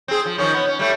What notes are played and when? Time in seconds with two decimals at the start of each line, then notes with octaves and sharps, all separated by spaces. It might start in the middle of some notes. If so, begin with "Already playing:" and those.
0.08 C4 G#4
0.26 F3
0.38 D#3 F3 C#4
0.54 B3
0.67 C#4
0.79 G3 A3